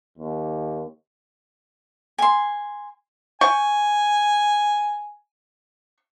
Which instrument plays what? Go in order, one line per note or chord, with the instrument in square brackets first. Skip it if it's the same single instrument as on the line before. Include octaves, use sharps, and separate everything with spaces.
[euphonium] D#2
[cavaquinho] G#5 C6
[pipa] G5 C#6 [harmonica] G#5